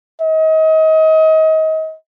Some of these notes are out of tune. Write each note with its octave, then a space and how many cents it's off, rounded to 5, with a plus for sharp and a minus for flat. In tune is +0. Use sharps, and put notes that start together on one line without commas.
D#5 +30